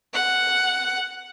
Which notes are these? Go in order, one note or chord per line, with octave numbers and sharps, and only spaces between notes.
F#5